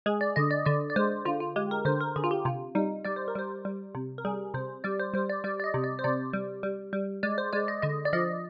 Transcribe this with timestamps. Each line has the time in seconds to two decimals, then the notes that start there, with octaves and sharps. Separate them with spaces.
0.06 G#3 G#4
0.21 D5
0.36 D3 D#5
0.51 D5
0.66 D3 D5
0.90 D5
0.96 G#3 C5
1.25 D3 F4
1.40 F4
1.56 G#3 G4
1.71 A#4
1.85 D3 C5
2.01 A#4
2.16 D3 G#4
2.24 F4
2.31 G4
2.45 C3 F4
2.75 G3 D#4
3.05 G3 D5
3.16 C5
3.28 A#4
3.35 G3 C5
3.65 G3
3.95 C3
4.18 A#4
4.25 G3 G#4
4.54 C3 C5
4.84 G3 D5
5.00 C5
5.14 G3 C5
5.29 D5
5.44 G3 D5
5.60 D5
5.64 D#5
5.74 C3
5.84 D5
5.99 C5
6.04 C3 D5
6.33 G3
6.63 G3
6.93 G3
7.23 G#3 D5
7.38 C5
7.53 G#3 D5
7.68 D#5
7.82 D3 D#5
8.05 D5
8.13 F3 D#5